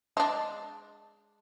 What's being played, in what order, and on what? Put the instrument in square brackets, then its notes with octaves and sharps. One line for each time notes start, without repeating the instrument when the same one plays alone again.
[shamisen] G#3 D4